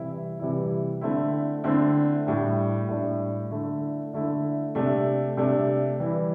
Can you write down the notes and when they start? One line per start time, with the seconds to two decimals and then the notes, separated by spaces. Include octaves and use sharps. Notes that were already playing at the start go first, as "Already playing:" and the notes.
Already playing: C3 E3 G3 E4
0.39 C3 E3 G3 E4
1.01 D3 A3 C4 E4
1.64 D3 A3 C4 E4
2.27 A2 G3 D4
2.88 A2 G3 D4
3.51 D3 A3 E4
4.13 D3 A3 E4
4.75 C3 A3 D4
5.37 C3 A3 D4
6.00 E3 G3 E4